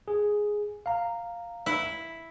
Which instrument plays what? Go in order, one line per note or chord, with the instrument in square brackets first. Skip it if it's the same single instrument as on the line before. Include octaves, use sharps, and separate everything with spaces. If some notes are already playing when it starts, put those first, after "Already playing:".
[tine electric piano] G#4
F5 A#5
[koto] E4